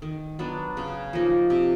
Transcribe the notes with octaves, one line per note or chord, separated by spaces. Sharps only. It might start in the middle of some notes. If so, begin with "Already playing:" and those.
D#3
F#3 B3 D4
C#3
F3 A#3 D#4
C3